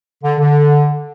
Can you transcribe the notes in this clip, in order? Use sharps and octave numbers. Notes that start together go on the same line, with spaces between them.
D3
D3